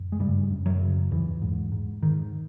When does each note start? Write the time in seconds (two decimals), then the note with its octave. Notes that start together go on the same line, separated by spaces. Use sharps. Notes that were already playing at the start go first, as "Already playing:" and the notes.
Already playing: F#2
0.12 G#3
0.20 G2 C#3 G3
0.50 F#2
0.66 F#2 F#3
0.81 C#3
1.11 E2 G#2 E3
1.42 G#2
1.72 G#2
2.03 G#2 D#3